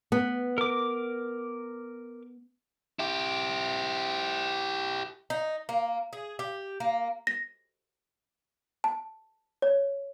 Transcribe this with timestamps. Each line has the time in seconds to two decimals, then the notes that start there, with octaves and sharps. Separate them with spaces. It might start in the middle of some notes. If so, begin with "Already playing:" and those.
0.12 B3
0.58 A#4 D6
2.99 E4 G4
5.30 D#4
5.69 A#3
6.13 G#4
6.39 G4
6.80 A#3
7.27 A#6
8.84 A5
9.62 C#5